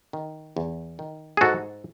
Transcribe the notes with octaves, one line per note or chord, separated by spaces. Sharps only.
D#3
E2
D#3
G#4
G#2 F#4 A4